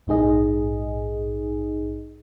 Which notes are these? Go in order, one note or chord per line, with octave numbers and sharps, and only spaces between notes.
A#1 G#2 D#4 G#4 D#5